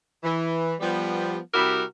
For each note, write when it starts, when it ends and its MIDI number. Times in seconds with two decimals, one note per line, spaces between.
0.24 0.74 52
0.80 1.37 53
0.80 1.37 55
0.80 1.37 59
1.54 1.83 48
1.54 1.83 55
1.54 1.83 64
1.54 1.83 66
1.54 1.83 67
1.54 1.83 70